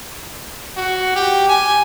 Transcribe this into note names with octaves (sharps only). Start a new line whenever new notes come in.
F#4
G4
G#5